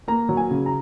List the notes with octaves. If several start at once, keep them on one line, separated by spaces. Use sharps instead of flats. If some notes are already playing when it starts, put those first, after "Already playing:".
A#3 A#5
F#3
G#5
C#3
A#5